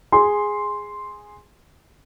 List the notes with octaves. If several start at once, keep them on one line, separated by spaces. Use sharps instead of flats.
G#4 C6